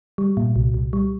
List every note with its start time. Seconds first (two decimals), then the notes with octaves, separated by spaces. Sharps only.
0.18 G3
0.37 A#2
0.56 C2
0.74 C2
0.93 G3